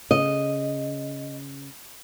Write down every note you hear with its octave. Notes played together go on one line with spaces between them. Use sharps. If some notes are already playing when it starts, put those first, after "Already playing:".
C#3 D#5